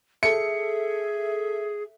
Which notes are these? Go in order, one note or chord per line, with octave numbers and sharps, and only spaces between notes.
G#4 A4 E5 C#7